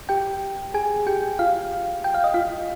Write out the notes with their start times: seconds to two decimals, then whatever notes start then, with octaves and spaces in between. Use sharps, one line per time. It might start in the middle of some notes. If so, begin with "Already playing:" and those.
0.09 G4 G5
0.74 G#4 G#5
1.07 G4 G5
1.39 F4 F5
2.04 G5
2.14 F5
2.24 D#5
2.34 F4 F5